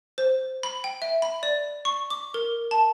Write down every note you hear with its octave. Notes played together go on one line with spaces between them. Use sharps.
C5
B5
G5
E5
B5
D5
C#6
D6
A#4
A5